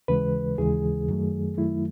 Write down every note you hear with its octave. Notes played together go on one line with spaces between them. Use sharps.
D#2 C#3 E3 G#3 B4
D#2 C#3 E3 G#3 G#4
F#2 D#3 F#3 A3
F#2 D#3 F#3 A3 E4